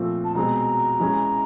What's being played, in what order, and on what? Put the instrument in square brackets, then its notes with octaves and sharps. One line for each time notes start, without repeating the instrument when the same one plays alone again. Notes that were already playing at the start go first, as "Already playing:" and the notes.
Already playing: [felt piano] A#2 F3 A3 C4
[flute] A5
[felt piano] B2 G#3 C4 [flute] A#5
[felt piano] E3 G#3 C#4